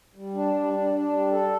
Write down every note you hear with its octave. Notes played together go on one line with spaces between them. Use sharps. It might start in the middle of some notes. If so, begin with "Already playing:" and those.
G3
D4
G3
D4
D4
G3
A4